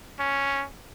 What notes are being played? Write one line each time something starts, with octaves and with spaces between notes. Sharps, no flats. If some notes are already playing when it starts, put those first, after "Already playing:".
C#4